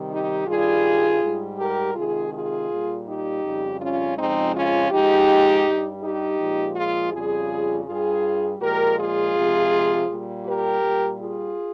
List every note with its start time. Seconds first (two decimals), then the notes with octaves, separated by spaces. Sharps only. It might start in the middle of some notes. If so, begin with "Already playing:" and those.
Already playing: C3 D#3 G3
0.11 D#4 G4
0.47 G2 D#3 G3 F4 G#4
1.22 G#2 G3
1.59 G4 A#4
1.95 C3 D#3 G#3 F4 G#4
2.33 F4 G#4
2.70 A#2 G3
3.06 D#4 G4
3.44 F2 C#3 G3
3.80 C#4 F4
4.17 F2 C#3 F3 G#3 C4 D#4
4.54 C#4 F4
4.91 G#2 F3 G#3 D#4 G4
5.66 G2 G3
6.02 D#4 G4
6.39 A#2 F3 G#3
6.76 F4 G#4
7.12 F2 C#3 G3 F4 G#4
7.87 G2 G3 F4 G#4
8.60 A#2 F3 G#3 G4 A#4
8.98 F4 G#4
9.35 C3 F3 G#3
10.09 A#2 G3
10.46 G4 A#4
10.82 A#2 G3
11.20 F4 G#4